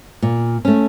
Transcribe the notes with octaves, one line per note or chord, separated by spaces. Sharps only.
A#2
A3 C#4